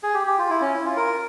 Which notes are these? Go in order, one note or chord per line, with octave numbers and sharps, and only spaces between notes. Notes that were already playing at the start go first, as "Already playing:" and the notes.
G#4
G4
G4
F4
E4
C#4
E4
F4
A#4